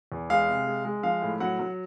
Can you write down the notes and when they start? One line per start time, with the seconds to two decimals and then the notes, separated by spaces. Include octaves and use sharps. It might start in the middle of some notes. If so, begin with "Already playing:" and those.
0.12 E2
0.30 G#3 F5
0.48 C3
0.67 G#3
0.85 G#3
1.03 F3 F5
1.22 A2
1.40 F#3 F#5
1.59 F#3